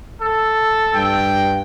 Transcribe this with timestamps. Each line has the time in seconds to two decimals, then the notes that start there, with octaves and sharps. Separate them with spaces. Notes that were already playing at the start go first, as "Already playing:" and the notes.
0.21 A4
0.94 G2 G5